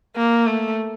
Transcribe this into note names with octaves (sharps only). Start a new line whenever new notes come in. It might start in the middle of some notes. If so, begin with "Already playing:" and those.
A#3
A3